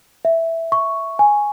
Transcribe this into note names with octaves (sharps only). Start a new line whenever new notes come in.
E5
C#6
G#5